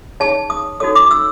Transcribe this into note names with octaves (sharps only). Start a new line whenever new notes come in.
D#4 G#4 C#5 A5
D#6
D#4 F#4 A4 C#5 D#6
D6
E6